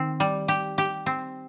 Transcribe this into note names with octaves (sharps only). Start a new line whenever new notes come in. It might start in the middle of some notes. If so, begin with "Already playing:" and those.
Already playing: D#3 C4
G3
G4
G4
C4